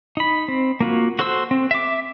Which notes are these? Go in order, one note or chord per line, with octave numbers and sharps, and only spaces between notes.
D#4 B5
C4
A#3 F4 F#4
F#4 A4 C5 C6 E6
C4
E5 D6